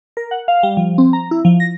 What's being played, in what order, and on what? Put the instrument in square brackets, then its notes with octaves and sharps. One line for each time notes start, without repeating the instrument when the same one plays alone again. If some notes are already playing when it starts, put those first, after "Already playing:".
[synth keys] A#4
F#5
F5
G3
F3
C4
A#5
E4
F3
A#6